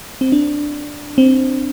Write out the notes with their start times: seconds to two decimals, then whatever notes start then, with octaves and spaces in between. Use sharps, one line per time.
0.21 C4
0.32 D4
1.18 C4